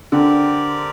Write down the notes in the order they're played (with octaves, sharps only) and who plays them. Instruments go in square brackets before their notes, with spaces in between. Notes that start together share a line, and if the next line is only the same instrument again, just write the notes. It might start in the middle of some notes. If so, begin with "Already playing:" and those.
[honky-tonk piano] D3 [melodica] C4 G4 A#4 D5